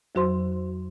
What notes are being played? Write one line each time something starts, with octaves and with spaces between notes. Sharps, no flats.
F2 F#3 F#4 C5 C6